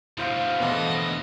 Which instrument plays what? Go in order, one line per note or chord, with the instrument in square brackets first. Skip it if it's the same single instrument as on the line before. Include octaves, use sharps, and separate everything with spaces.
[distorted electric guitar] D2 B2 [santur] E4 C5 F5
[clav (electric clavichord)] E3 B3 [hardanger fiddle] A4 D#5